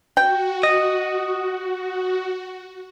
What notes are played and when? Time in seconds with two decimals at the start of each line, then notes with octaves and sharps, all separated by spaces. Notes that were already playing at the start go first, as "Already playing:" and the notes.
0.17 F#4 G5
0.63 D#5